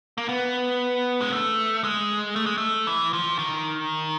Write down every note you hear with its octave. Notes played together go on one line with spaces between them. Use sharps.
A#3
B3
G#3
A3
G#3
A3
G#3
A3
E3
F3
D#3